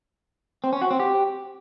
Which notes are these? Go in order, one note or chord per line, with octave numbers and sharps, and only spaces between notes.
C4
C#4
F#4
C4
G4